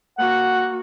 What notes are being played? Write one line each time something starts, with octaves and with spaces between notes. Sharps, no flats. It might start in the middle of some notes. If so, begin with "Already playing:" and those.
A#3 F#4 F#5